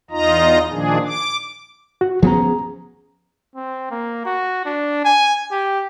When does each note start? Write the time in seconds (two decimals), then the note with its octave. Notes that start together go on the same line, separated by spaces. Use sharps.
0.11 E2 D#4 F4 D#5 A#5
0.71 A#2 D#3 F3 D4 G#4
1.05 D6
2.01 F#4
2.22 F3 B3 C#4 G#4 A#5
3.56 C4
3.91 A#3
4.25 F#4
4.66 D4
5.05 G#5
5.51 G4